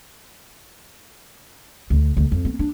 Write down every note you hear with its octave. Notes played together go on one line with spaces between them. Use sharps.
D2
D2
F2
B3
D4